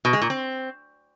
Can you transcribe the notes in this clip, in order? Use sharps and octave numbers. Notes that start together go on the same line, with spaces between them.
B2
G#3
A#2
C4